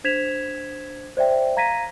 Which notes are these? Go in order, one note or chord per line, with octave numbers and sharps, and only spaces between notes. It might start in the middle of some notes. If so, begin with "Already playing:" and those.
D4 C5 G#6 B6 E7 F7
C5 D5 E5 G5
F5 A#5 G#6 A#6 B6 D#7